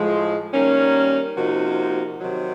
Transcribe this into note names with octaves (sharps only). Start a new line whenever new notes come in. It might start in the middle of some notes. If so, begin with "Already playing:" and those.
Already playing: A2 F3 G#3
D#3 G3 A#3 C#4
C3 F3 A#3 D#4 F#4
C3 D#3 F#3